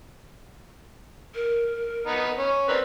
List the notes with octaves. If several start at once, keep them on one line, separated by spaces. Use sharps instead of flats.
A#4
B3 D#4
C#4
C4 A#4 B4 D5